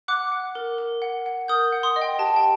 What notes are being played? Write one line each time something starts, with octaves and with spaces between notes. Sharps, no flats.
F#5 D6 F#6
F#5
A#4
A#4
F#5
F#5
A#4 D#6 G6
F#5
C6 D#6
D#5
G5
G4 A5
G5